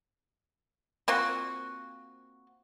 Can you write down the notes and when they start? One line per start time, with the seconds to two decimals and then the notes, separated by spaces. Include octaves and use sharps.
1.08 A#3 C4 F4 F#4